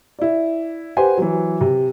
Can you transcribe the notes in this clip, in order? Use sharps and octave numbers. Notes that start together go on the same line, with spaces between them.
E4 D5
G4 B4 C5 F#5 G#5
E3 F#3
C3